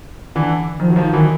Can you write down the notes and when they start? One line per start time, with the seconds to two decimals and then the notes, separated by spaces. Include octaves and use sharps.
0.35 D3 E3
0.80 D#3 F3
0.90 F#3
0.96 D#3 F3
1.13 D#3 E3 F#3